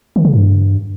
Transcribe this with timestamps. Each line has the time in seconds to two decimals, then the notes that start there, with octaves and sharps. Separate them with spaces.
0.16 D#3
0.25 C#3
0.34 G2